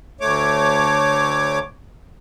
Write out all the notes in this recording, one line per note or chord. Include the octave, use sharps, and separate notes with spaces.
D2 A3 C#5 D6